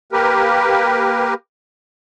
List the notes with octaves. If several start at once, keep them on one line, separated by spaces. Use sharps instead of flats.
A#3 G4 A#4 B4